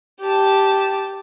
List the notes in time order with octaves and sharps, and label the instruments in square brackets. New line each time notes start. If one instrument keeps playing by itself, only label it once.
[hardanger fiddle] G4 A5